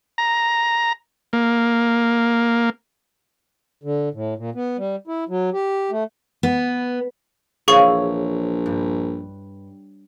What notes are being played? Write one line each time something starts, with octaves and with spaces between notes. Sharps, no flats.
A#5
A#3
D3
A2
A#2
B3
G3
E4
F#3
G4
A3
B3
A#1 E3 G#4 C#5 F5 C#6
G2